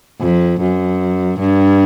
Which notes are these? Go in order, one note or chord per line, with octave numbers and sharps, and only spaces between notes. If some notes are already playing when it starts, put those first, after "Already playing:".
F2
F#2
G2